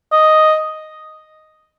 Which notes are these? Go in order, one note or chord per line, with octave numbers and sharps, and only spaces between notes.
D#5